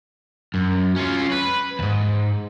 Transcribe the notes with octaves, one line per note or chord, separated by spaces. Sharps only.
F#2
C#4 F4
B4
D#2 G#2